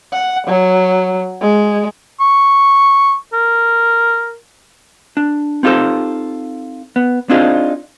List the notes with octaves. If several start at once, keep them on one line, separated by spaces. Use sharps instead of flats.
F#5
F#3
G#3
C#6
A#4
D4
C4 D#4 F4 G4 A4 C5
B3
C4 D4 D#4 F4 G#4 C5